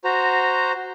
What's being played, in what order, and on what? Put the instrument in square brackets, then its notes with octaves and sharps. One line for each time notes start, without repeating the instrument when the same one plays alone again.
[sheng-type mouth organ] F#4 C5 A#5